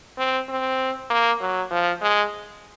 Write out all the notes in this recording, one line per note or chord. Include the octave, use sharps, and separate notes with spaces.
C4
C4
A#3
F#3
F3
G#3